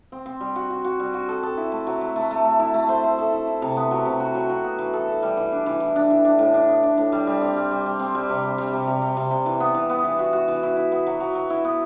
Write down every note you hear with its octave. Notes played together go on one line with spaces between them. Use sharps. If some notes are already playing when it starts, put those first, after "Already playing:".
C4
C4
G3
F#4
F#4
F#4
G3
F#4
A4
A4
E4
A3
F#3
A3
A3
A3
A3
E4
A3
C5
C5
A4
E4
E4
C3
B3
F#3
C3
F#4
F#3
F#4
B3
E3
A4
A4
G3
E3
D4
E3
E3
D4
E3
D4
A2
D4
B3
D4
A2
G3
G3
C4
G3
G3
G3
C4
G3
C3
G3
G3
C3
C3
C3
C3
C3
E3
B3
E3
B3
E3
F#4
F#4
E3
E4
E4
B3
F#3
F#3
F#3
E4
B3